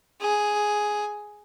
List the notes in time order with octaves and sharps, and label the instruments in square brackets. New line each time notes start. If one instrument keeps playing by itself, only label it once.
[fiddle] G#4